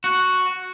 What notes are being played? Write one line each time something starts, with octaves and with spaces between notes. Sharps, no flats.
F#4